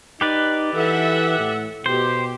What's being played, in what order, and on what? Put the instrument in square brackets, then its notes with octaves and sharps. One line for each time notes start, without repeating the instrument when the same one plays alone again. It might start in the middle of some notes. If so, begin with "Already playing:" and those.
[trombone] D#4 [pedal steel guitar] G4 B4 D5
[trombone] E3 [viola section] A4 E5 F#5
[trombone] A2
[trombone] B2 [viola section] G4 [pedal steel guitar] C5